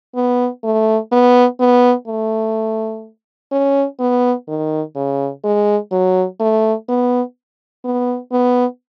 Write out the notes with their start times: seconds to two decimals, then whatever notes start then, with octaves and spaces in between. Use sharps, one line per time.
0.15 B3
0.64 A3
1.12 B3
1.60 B3
2.08 A3
3.52 C#4
4.00 B3
4.48 D#3
4.95 C#3
5.43 G#3
5.92 F#3
6.40 A3
6.89 B3
7.85 B3
8.32 B3